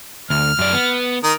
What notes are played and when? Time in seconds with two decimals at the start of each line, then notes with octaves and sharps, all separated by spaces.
0.30 D2 F6
0.59 F#2 D5
0.73 B3
1.24 D#3 A#4 D#6